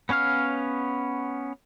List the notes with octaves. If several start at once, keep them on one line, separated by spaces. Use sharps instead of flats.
B3 C#4 C#5 F5 F6